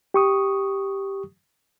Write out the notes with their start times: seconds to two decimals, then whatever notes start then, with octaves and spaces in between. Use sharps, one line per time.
0.14 G4 C#6 D#6